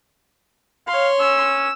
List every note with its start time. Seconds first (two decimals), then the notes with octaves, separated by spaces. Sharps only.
0.87 C#5 F5 C6
1.20 C#4 E6